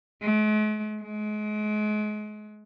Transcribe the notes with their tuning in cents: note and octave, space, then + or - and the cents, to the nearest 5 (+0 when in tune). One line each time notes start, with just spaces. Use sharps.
G#3 +45
G#3 +35